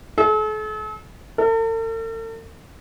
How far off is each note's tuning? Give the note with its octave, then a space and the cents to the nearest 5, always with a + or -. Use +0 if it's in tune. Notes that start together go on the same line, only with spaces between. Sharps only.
A4 -45
A4 +45